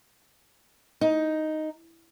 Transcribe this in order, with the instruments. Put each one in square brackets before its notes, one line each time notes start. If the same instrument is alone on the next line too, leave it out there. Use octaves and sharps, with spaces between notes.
[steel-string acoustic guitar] D#4